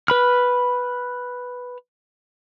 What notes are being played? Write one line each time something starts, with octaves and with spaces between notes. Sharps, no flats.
B4 B5 F6